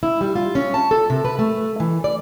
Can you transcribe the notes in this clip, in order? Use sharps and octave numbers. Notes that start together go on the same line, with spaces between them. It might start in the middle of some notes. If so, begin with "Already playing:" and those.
E4
G3
F4
C#4
A5
A4
C3
B4
A3
E3
D5